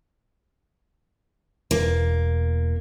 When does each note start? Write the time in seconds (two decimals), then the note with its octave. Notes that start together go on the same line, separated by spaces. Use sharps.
1.71 E1 A#3